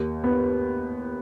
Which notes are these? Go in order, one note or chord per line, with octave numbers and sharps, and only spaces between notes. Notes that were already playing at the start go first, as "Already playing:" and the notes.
Already playing: D#2
B3